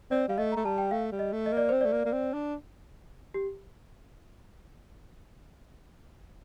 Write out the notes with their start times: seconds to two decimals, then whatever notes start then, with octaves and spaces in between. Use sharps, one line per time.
0.11 C4 D5
0.28 G3 F5
0.38 A3 D#5
0.52 A3 A#5
0.64 G3 A5
0.78 G5
0.91 A3 F5
1.12 G3
1.19 D#5
1.33 A3
1.46 D#5
1.52 A#3 D5
1.69 C4 C5
1.81 A3 D5
1.92 A#3
2.05 A#3
2.13 C4
2.33 D4
3.34 G4